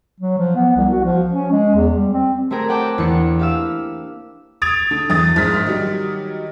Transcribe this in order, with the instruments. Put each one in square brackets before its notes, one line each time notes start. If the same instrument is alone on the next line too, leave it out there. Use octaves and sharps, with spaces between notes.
[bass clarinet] F#3
F3
B3
C2
F#4
F3
C#4
G#3
E2
G3
C4
[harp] A3 C4 G4 G#4 A#4
D5 F#5 G5 A5 D6 G6
E2 A#3 D4 C#7
G4 F5 E6
[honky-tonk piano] D#6 G#6 A6 D7 F7
D3
E2 D#6 A6
A#1 G#2 F6 B6
D#3 F#3 G3